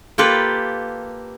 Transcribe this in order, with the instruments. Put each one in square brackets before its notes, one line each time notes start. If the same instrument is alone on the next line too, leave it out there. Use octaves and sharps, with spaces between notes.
[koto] A#3 F4 G4 A4 B4